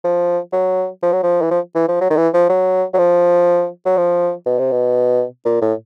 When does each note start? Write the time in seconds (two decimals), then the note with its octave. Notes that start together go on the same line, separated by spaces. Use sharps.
0.04 F3
0.53 F#3
1.02 F3
1.13 F#3
1.23 F3
1.42 E3
1.51 F3
1.75 E3
1.88 F3
2.01 F#3
2.10 D#3
2.17 E3
2.33 F3
2.49 F#3
2.94 F#3
2.98 F3
3.86 F#3
3.97 F3
4.46 B2
4.59 C3
4.71 B2
5.45 A#2
5.62 A2